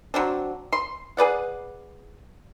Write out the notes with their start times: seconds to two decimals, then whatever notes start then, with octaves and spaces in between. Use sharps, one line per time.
0.14 F#3 C4 D4
0.73 C6
1.17 G#4 B4 D5 F#5